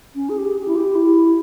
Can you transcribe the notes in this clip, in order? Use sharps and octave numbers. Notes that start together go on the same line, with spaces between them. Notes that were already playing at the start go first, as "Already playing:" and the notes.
C#4
G#4
G4
G4
E4
G4
E4